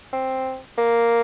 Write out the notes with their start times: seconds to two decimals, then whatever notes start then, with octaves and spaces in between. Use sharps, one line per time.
0.13 C4
0.78 A#3